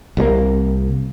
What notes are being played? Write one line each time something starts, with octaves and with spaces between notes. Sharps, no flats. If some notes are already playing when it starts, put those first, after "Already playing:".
C2 C3 F#3 A#3